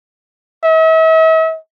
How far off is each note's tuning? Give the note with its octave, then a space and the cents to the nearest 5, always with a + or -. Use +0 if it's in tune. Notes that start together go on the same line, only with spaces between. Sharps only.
E5 -45